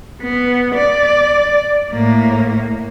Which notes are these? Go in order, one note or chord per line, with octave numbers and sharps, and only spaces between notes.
B3
D5
A2 A#3